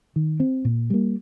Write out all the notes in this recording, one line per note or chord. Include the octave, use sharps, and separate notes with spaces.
D#3
C4
A#2
G3 A#3